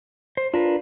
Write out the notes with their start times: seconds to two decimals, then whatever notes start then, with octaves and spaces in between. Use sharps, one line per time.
0.37 C5
0.54 D4 F4 A#4 B4